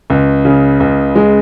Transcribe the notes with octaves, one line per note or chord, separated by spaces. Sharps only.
C#2
C#3
C#2
G#3